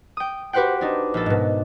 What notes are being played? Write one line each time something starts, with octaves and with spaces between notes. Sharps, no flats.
G5 D#6
F#4 G4 B4 C5 F#5 G5
D4 D#4
A#1 A4
G#2 B2